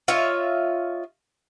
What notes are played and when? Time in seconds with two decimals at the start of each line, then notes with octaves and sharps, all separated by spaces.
0.08 F4 C#5 D#5 E5